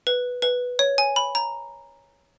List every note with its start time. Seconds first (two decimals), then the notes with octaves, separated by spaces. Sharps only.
0.07 B4
0.42 B4
0.79 C#5
0.98 G#5
1.16 B5
1.35 A#5